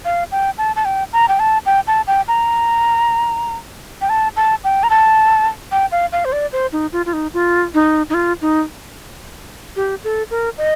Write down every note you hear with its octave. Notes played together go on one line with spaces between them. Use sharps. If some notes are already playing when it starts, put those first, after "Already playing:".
F5
G5
A5
A5
G5
A#5
G5
A5
G5
A5
G5
A#5
G5
A5
A5
G5
A#5
A5
G5
F5
F5
C5
D5
C5
D#4
F4
F4
D#4
F4
D#4
D#4
F4
D#4
G4
A4
A#4
D#5